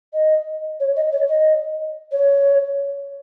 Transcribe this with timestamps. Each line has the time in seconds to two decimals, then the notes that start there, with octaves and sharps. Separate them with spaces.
0.14 D#5
0.80 C#5
0.96 D#5
1.13 C#5
1.29 D#5
2.12 C#5